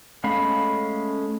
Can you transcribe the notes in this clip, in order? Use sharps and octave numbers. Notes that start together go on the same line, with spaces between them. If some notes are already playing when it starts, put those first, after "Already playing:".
G#3 A3 C#4 F5 B5